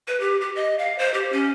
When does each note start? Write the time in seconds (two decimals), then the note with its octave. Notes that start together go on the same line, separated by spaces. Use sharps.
0.08 B4
0.20 G4
0.41 G4
0.56 D#5
0.79 F5
0.99 C5
1.14 G4
1.32 C#4